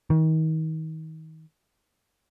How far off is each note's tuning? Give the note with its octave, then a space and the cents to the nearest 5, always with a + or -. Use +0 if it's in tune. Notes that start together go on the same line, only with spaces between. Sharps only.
D#3 +35